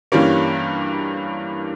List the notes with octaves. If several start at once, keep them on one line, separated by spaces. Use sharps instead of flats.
G2 E3 G3 A#3 C#4